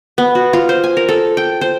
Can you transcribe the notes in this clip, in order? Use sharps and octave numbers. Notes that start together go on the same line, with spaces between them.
B3
F#4
F4
C5
G#5
A#4
A4
G5
C5